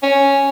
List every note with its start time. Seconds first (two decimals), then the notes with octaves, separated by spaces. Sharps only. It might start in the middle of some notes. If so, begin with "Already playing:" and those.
0.03 C#4